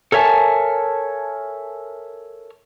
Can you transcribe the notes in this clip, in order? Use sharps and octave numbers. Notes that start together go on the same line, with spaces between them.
A4 A#4 C#5 E5 G#5 A5